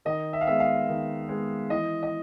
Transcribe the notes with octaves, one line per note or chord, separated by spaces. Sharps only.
D#3 D#5
E5
F5
G#3 B3 E5
F5
D#3
G#3 B3
E3 D#5
D#5